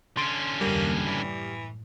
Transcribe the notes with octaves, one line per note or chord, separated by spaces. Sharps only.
D3 C#4 C6 D7
F#1 D#2 G3 A#3
A2 E3